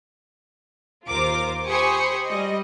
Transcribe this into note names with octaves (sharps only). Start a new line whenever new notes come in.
D#2 F4 A#4 C5 D6
G4 C5 G#5 B5 C#6 D#6
G3 D#5